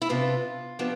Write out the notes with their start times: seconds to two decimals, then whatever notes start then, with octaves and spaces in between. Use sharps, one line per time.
0.02 E4
0.09 C3 F3 B3 D4 F4
0.79 C3 F3 B3 D4